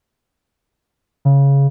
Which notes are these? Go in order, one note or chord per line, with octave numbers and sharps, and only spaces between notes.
C#3